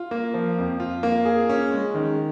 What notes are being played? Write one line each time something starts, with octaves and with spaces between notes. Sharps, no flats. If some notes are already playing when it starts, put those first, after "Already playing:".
Already playing: F4
A#3
F3
F2
F4
A#3
G#4
C#4
G#3
D#3